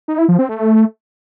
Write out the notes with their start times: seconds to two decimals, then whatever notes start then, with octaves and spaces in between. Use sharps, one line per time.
0.08 D#4
0.18 E4
0.29 F3
0.39 C4
0.49 A3